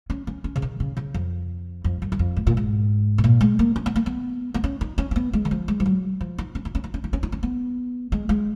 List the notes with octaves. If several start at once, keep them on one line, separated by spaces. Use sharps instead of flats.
C#4
C#4
C#4
C#3
D#3
C#3
C#3
F2
F2
F#2
F#2
F2
G#2
A#2
G#2
B2
A#2
G#3
A#3
C#4
B3
A#3
B3
B3
C#4
D#4
C#4
C#4
B3
G#3
D#3
F3
G#3
F3
F#3
F3
D#4
C#4
D#4
C#4
D#4
C#4
D#4
C#4
D#4
C#4
B3
G#3
G#3